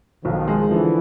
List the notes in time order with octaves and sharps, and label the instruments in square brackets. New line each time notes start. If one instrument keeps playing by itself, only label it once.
[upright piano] B1 [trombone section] D#3 F3
[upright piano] G#3
[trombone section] D3 E3 [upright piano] F3